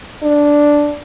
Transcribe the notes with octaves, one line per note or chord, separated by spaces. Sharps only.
D4